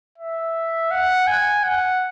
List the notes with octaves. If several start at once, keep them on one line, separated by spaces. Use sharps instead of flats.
E5
F#5
G#5
F#5